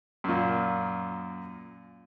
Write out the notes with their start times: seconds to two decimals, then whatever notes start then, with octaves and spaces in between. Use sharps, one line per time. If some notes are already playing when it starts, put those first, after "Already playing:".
0.24 F#2 A#2